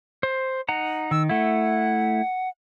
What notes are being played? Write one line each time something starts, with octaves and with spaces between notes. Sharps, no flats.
C5
D#4 F#5 A#5
D#3 E6
A3 E4 F#5